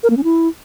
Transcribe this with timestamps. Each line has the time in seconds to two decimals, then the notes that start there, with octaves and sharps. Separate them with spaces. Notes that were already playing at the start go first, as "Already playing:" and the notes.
0.03 A#4
0.10 A#3
0.17 C#4
0.24 E4